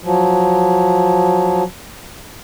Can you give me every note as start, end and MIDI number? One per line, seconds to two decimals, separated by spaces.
0.04 1.63 53
0.04 1.63 54